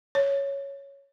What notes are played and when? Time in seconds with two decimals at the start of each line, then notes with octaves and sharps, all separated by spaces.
0.15 C#5